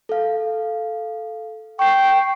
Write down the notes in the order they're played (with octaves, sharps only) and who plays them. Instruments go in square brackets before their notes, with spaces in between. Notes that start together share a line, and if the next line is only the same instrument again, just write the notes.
[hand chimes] A4 F5
[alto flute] G5 [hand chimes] C#6 C7